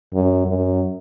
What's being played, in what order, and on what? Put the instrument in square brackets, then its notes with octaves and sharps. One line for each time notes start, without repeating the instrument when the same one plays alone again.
[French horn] F#2
F#2